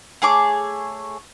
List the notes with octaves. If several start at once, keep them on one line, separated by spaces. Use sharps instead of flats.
A3 G#4 C#5 D6